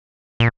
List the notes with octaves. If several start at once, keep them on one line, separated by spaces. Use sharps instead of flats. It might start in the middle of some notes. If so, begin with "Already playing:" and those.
A#2